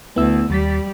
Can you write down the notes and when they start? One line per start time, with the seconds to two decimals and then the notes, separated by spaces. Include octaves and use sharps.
0.16 D2 B3 E4 E6
0.50 D#2 G3 A6 B6